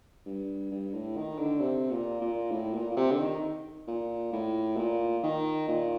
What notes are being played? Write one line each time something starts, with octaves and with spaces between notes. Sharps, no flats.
G2
G2
A2
D#3
D3
C3
A#2
A#2
A2
A#2
A#2
C3
D3
D#3
A#2
A2
A#2
D#3
A#2